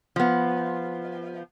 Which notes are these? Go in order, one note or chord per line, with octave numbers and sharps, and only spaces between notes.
F3 B3